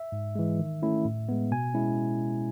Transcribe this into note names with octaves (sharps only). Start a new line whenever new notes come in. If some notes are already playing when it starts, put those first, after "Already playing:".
Already playing: E5
G#2
E3 G#3
D#3
A3 C#4 E4
A2
G#3 B3
B2 G#5
G#3 C#4 E4